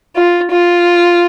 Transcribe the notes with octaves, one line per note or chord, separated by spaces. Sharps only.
F4
F4